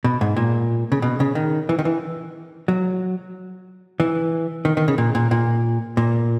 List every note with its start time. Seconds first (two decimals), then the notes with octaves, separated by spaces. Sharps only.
0.04 B2
0.21 G#2
0.36 A#2
0.92 C#3
1.02 B2
1.20 C#3
1.35 D#3
1.69 E3
1.79 D#3
1.85 E3
2.68 F#3
4.00 E3
4.65 D#3
4.77 D#3
4.88 C#3
4.98 A#2
5.15 A#2
5.31 A#2
5.97 A#2